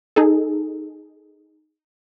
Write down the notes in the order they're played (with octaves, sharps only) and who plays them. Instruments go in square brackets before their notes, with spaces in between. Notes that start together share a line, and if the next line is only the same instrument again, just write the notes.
[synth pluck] D#4 G#4 A4